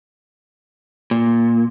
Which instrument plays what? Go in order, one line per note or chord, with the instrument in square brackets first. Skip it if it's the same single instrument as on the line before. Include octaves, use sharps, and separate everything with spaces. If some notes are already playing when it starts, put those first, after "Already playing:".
[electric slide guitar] A#2